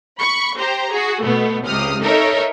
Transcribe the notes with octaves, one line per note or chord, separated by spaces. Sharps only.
B5 C#6
G4 C5 A#5
F#4 G#4
B2 A3 B3
C#2 C3 D#6 F6
D#4 A4 A#4 C#5 E5